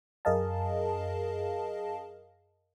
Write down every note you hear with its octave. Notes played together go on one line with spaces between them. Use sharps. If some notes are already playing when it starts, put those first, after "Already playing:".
F#2 G#4 A#4 D#5 F5 A5